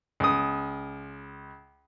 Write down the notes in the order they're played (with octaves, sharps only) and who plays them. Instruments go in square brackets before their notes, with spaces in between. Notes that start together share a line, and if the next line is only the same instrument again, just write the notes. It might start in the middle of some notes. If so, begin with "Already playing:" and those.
[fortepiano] C#2 D#6